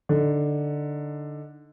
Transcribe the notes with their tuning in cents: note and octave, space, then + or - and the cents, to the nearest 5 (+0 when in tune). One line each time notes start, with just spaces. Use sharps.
D3 +0 D#4 -5